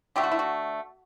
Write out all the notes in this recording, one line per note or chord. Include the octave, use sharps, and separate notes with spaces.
D3 A3 G4
F#4
E4
F#4